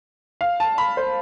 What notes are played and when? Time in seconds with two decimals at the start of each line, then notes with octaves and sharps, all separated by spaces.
0.41 F5
0.60 A5
0.78 B5
0.97 C5